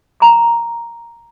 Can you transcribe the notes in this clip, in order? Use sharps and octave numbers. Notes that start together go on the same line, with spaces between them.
A#5 D6